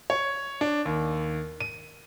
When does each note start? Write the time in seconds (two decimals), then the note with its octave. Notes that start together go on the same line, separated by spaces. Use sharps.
0.10 C#5
0.61 D4
0.85 D#2
1.60 D#7